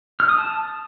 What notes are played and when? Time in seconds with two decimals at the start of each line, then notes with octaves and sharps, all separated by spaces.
0.20 F6
0.29 D#6
0.38 A5